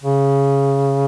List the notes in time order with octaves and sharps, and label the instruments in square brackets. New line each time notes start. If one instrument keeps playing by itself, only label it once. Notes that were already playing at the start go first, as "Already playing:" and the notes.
[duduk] C#3